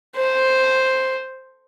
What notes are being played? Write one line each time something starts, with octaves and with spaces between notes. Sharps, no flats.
C5